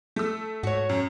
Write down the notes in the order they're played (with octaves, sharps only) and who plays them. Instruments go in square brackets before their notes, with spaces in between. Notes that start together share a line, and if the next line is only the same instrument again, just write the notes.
[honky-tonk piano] A3 E6
[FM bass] G#2 [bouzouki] F#4 C#5
[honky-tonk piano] F#2